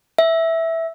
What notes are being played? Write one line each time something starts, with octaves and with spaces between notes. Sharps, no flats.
E5